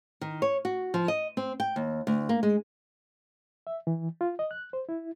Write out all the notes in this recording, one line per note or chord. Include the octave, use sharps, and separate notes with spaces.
D#3
C#5
F#4
F3
D#5
C4
G5
D#2
D2
A#3
G#3
E5
E3
F4
D#5
F#6
C5
E4